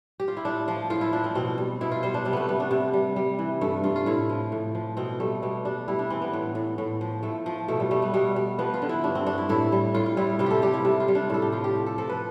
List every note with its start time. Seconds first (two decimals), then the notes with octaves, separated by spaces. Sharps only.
0.20 G4
0.28 F4
0.37 E4
0.45 A2 D4
0.68 F3 F4
0.90 A2 F4
1.01 E4
1.13 F3 D4
1.24 C4
1.35 B2 C4
1.58 G3
1.81 B2 E4
1.92 F4
2.03 G3 C5
2.14 D4
2.25 C3 C4
2.33 A3 B3
2.49 G3 B3
2.60 D4
2.71 C3
2.94 G3
3.16 G3
3.39 E3
3.61 G2 A3
3.84 G2 F4
3.96 F4
4.06 A2 E4
4.30 F3
4.52 A2
4.75 F3
4.97 B2 C4
5.20 G3 A3
5.43 B2 G3
5.65 G3 D4
5.88 G3 E4
5.99 D4
6.10 E3 C4
6.22 B3
6.33 A2
6.55 A2
6.78 A2
7.01 F3
7.23 A2 A3
7.46 F3
7.68 B2 A3
7.80 G3
7.91 G3 A3
8.02 B3
8.14 B2 G3
8.36 G3
8.59 F3 B3
8.74 F4
8.82 D3
8.89 E4
9.04 G2 D4
9.15 C4
9.26 G2 D4
9.38 E4
9.49 A2 E4
9.72 G3
9.94 A2 F4
10.06 F4
10.17 G3 E4
10.39 C3 F4
10.46 G4 A4
10.62 G3 G4
10.74 E4
10.85 C3
11.00 F4
11.08 G3
11.15 D4
11.30 A2 A4
11.42 G4
11.52 F3 F4
11.64 G4
11.75 A2
11.86 A4
11.98 F3 A4
12.10 B4